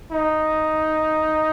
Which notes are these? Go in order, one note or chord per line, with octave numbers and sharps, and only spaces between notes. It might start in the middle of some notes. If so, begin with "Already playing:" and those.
D#4